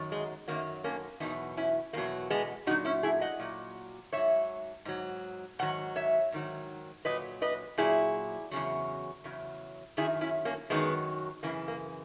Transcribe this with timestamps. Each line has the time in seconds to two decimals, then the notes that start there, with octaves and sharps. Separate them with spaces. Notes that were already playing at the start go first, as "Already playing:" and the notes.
Already playing: F#2 D#3 F#3
0.12 G#3
0.48 F#2 D#3 F#3 A#3
0.84 A#3 C#4
1.20 E2 B2 F#3 B3 D#4
1.57 C#4 E4
1.93 E2 B2 F#3 A#3
2.30 G#3 B3
2.67 A#2 D#4 F#4
2.70 F#3
2.85 C#4 E4
3.03 E4 G#4
3.21 D#5 F#5
3.40 A#2 F#3
4.13 G#2 F#3 C#5 E5
4.85 G#2 F#3
5.59 G#2 D#3 F#3 F#5
5.96 C#5 E5
6.32 G#2 D#3 F#3
7.05 A#2 F#3 B4 D#5
7.42 B4 D#5
7.78 A#2 F#3 E4 G#4
8.51 E2 C#3 F#3
9.24 E2 C#3 F#3
9.97 F#2 D#3 F#3 E4 G#4
10.21 C#4 E4
10.45 A#3 C#4
10.70 F#2 D#3 F#3 G#3 B3
11.43 F#2 C#3 E3 A#3
11.68 A#3